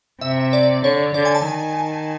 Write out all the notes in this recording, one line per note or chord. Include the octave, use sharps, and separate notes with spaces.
C3 E5
D5
D3 C#5
D3 D5
G#5
A5
D#3 A5